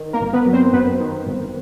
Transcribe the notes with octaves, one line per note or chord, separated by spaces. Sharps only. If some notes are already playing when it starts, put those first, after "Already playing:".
Already playing: D#3
A#3 A#4
G1
B3 B4
F#3
C4 C5
F#2 B3 B4
D#3
G1